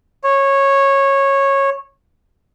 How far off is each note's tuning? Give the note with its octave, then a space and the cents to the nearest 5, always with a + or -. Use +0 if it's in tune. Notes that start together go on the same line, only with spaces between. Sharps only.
C#5 -15